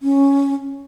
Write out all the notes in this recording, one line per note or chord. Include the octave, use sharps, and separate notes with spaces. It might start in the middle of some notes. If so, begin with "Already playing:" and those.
C#4